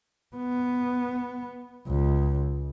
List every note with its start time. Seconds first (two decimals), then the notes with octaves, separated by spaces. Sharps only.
0.36 B3
1.88 C#2